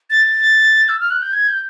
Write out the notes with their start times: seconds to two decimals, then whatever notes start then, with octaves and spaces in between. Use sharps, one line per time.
0.10 A6
0.89 E6
1.00 F6
1.10 F#6
1.22 G6
1.33 G#6
1.48 G6